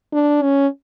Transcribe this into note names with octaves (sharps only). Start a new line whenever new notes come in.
D4
C#4